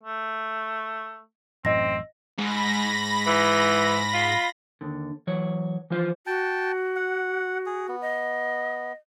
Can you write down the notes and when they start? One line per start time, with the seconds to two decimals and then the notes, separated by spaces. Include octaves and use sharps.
0.04 A3
1.65 A1 F#2 A2 C4 D#5 A#6
2.39 G#2 B5 A#6
3.27 E3
4.14 F4
4.81 D#2 D3
5.27 E3 F#3 C#5
5.90 E3 F3 F4 C5
6.27 F#4 G5 A5
6.96 F#5
7.66 G#4
7.88 B3
8.02 D#5